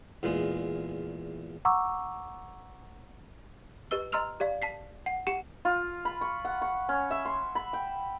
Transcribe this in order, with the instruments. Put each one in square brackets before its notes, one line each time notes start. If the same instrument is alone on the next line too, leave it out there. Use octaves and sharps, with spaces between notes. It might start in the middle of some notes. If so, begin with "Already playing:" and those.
[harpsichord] E2 A#2 G#3
[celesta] F#5 A#5 C#6 D6 E6
[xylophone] G4 B4 D#5 E6 G7
D#5 A#5 C6 E6 F6 F7
G4 D5 F5
A5 B6 C7
F#5
G4 F#5 C#7 E7
[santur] F4
B5
C#6
F#5
C#6
C#4
E5
C6
B5
G5